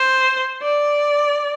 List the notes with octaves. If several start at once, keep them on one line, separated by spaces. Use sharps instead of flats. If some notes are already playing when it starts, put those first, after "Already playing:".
Already playing: C5
D5